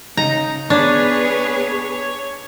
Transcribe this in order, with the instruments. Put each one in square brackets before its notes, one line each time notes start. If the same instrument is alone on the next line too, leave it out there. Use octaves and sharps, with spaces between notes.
[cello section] C#3 [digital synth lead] D#4 [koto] A#5
[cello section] B3 G#4 B4 [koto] D4 [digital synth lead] C#5